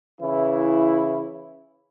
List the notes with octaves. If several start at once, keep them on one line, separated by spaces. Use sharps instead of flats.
C#3 E3 E4